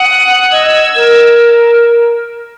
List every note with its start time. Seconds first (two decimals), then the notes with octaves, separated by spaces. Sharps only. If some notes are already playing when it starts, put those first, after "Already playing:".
Already playing: F#5 D#6 F#6
0.52 D#5 E6 G#6
0.95 A#4